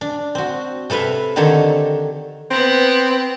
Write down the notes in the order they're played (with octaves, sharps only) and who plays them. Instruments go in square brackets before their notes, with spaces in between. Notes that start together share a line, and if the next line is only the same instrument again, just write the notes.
[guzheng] D4
C4 F#4
C3 A4 B4 E5 F5
D3 D#3 C4 G4 A4 C#5
[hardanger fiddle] B3 F#5 [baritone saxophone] C4